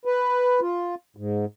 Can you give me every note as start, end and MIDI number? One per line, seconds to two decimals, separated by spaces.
0.05 0.60 71
0.61 0.95 65
1.17 1.45 44